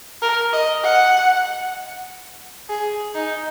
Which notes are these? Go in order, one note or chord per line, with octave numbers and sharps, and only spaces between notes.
A#4
D#5
F#5
G#4
D#4